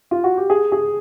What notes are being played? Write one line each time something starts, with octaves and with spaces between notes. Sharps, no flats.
F4
F#4
G4
G#4
G#4